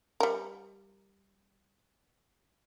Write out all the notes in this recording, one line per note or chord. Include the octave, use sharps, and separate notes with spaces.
G3 A#4